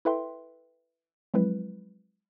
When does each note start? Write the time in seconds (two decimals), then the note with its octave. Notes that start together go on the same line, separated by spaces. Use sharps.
0.05 E4 A4 B4 E5 G5 C6
1.34 F3 F#3 G#3 C4 E4 B4